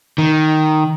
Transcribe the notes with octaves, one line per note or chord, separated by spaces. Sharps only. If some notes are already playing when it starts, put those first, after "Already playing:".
D#3